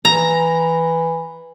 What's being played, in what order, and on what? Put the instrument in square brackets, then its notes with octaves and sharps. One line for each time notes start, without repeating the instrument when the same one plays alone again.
[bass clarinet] E3 [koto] A#5